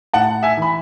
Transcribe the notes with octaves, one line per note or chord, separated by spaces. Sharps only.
A2 F#5 A5
E5 G#5
E3 B5